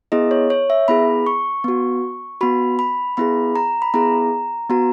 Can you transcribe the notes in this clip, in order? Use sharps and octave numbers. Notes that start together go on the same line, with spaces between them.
B3 E4 G#4 D#5
C#5
C#5
E5
B3 E4 G#4 B5
C#6
B3 F#4
B3 F#4 B5
B5
B3 E4 G#4 B5
A#5
B5
B3 E4 G#4 A#5
B3 F#4 A#5